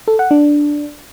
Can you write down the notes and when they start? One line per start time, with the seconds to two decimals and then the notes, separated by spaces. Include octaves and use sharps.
0.08 A4
0.19 F#5
0.31 D4